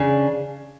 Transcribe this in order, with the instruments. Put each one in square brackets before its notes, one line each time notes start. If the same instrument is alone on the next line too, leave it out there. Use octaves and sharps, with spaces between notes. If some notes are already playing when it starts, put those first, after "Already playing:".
Already playing: [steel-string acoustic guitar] C#3 D4